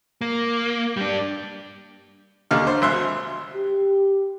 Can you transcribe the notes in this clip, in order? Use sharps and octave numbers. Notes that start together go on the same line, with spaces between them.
A#3
G3 D4
D#2 D3 F6
C5
G#1 E5 C6 F#6
G4